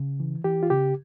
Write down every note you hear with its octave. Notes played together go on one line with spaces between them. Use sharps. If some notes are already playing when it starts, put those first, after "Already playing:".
Already playing: C#3
E3
E3 G4
F4
C#3 G4